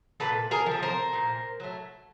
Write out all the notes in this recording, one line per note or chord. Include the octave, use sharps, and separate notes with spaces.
A#2 A4 B4
G#4 A#4
F3
A3
A#4 C5
A#2
F#3 A3